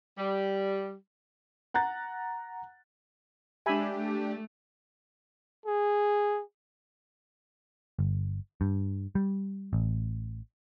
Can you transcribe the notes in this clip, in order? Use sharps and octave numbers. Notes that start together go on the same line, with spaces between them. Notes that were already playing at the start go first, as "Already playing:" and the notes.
G3
F#5 A#5 F#6 A6
G#3 D4 G4 E5 G#5 B5
A3
G#4
G1
G2
G3
A1